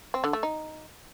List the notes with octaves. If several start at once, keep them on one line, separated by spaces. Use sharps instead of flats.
C4
D3
A3
D#4